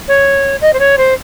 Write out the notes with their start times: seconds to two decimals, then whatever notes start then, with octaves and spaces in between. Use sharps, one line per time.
0.08 C#5
0.61 D#5
0.73 C5
0.79 C#5
0.98 C5